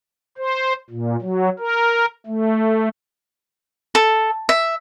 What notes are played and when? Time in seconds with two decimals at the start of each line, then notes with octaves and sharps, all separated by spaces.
0.38 C5
0.90 A#2
1.22 F#3
1.59 A#4
2.26 A3
3.95 A4
4.49 E5